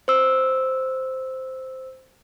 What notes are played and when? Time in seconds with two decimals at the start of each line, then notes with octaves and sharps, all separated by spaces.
0.08 C5 E6